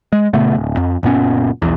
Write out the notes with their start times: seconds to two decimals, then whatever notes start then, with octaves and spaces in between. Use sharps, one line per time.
0.12 G#3
0.33 A#2 C#3 A3 B3
0.56 D1
0.77 F2
1.03 F#1 A#2 B3 C#4
1.62 B1 E2